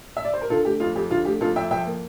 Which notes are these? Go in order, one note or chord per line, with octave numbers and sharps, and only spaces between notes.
E5
D5
C5
A#4
D3 F4 A4
A3 G4
F2 F4
F2 G4
D3 F4
A3 G4
F2 F4 A4
F2 E5 G5
F3 E5 G5
A#3